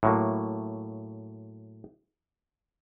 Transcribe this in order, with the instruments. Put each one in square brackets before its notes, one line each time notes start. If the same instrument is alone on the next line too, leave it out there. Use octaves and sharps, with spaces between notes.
[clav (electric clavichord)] A2 F#3 A#3